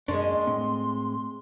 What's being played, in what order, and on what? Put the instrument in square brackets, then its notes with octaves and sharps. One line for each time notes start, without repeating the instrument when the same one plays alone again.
[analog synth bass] F#2 [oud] G#3 A#3 C#4 [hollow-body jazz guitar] D4 [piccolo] C6
[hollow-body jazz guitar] A2 [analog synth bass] C4